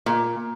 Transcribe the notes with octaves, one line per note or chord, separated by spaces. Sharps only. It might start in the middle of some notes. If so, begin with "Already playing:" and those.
A#2